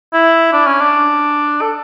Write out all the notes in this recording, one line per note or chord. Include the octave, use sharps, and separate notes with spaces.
E4
D4
C#4
D4
A4